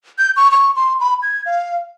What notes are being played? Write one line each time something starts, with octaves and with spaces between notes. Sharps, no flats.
G6
C#6
C#6
C6
B5
G#6
F5